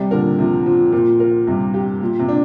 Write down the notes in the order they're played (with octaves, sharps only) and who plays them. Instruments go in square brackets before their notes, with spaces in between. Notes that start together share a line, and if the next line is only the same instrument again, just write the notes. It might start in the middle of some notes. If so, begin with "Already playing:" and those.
Already playing: [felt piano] C3 [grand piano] G3
[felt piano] A#2 D3 [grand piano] A#4
[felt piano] C3 [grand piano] F3
[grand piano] F3
[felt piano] A#2 [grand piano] F3
[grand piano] A#4
[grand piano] G2 [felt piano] C3
[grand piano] G4
A#2
[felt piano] C3
[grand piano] D4